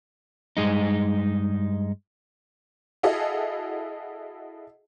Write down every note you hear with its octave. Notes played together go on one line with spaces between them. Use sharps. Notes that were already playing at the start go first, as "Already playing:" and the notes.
G2 G#3 D#4
E4 F#4 G#4 A4 D#5 F5